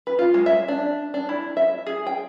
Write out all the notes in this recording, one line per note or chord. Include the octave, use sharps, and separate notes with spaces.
B4
F4
G#3
E5
D4
D4
E4
E5
G#4
G5